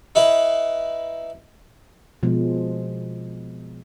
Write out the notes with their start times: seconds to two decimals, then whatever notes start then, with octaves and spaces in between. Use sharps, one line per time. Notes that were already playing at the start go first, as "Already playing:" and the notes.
0.15 D#4 E4 B4
2.23 B2 F3 G#3